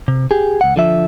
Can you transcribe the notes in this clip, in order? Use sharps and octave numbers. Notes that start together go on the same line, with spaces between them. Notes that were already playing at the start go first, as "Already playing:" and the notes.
C3
G4 G#4
C#2 F#5
D3 F3 E5